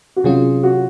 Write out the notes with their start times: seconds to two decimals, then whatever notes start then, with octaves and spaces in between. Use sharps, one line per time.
0.16 F#4
0.24 C3 F#3 C#4 F4 G#4
0.63 F#4